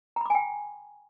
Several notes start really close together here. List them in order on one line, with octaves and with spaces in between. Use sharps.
A#5 B5 D6 G#5 G5